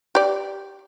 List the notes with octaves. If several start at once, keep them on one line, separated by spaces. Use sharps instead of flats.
G4 D5